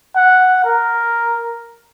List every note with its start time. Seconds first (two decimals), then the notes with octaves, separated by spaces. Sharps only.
0.16 F#5
0.65 A#4